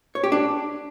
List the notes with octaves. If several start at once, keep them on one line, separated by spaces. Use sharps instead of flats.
C#5
G4
D4